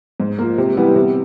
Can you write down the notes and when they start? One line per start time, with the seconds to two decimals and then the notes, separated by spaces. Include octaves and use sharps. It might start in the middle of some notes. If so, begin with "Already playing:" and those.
0.20 G#2
0.38 F3 A#3
0.58 C3
0.77 E3 G3 B3
0.96 C3